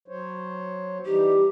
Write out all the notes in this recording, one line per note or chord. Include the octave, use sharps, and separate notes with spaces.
F#3 C5 C#5
E3 G3 D#4 G4